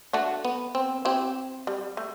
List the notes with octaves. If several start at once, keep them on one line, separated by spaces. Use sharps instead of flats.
A3 D4 F#4
B3
C4
C4 E4 G4
G3
A3